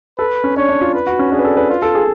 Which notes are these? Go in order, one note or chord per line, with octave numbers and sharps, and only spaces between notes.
A4 B4
C#4
D4 C#5
D4
F4
B4
F#4
C#4
D4 G#4
B4
A4
B4
F4 B4
A4
G#4